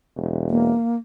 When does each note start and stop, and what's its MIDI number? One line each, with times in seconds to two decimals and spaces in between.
0.16 0.70 28
0.50 0.96 58